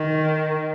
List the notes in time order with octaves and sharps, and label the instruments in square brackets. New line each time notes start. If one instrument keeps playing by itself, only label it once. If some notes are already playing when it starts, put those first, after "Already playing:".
Already playing: [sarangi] D#3